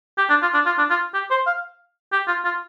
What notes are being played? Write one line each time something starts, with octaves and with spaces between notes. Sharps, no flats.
G4
D4
F4
D4
F4
D4
F4
G4
C5
F5
G4
F4
F4